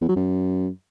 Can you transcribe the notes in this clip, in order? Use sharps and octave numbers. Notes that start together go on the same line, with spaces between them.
E2
F#3
F#2